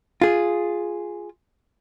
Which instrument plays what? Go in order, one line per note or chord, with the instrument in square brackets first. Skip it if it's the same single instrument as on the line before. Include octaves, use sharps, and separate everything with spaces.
[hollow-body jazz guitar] F4 G#4